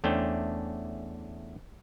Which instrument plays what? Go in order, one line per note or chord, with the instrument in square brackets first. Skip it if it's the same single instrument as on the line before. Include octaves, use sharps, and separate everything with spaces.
[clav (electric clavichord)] E2 A3 C#4 D4 C5 G5